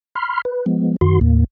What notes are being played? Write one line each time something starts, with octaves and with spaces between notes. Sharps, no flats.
B5 C6 F6
B4
F3 G#3 B3
F#2 D#3 F#4 C6
D#2 A2 A#3